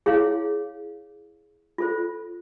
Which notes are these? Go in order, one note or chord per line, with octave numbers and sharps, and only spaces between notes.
E4 G#4 C#5 F5
F4 A4 C5